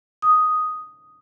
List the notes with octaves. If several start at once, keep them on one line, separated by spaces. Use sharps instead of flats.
D#6